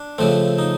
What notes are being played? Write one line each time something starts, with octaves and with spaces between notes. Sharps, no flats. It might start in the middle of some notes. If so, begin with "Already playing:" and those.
Already playing: D4
C#3 F3 A3 C4
D#4